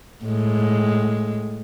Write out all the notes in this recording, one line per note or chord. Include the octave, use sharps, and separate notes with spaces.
A2 G#3